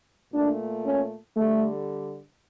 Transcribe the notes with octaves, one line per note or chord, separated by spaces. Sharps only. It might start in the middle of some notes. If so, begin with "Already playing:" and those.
A#2 A3 D4
C#4
D3 G3 A3